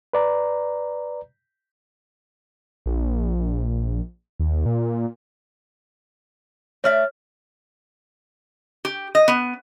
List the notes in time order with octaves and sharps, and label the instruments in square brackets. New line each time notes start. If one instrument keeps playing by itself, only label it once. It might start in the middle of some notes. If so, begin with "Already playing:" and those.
[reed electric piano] B4 D5 A#5
[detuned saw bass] A#1
D#2
A#2
[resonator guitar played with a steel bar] A3 D5 E5 [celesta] C#5 F6
[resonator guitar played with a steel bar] G4
D#5
B3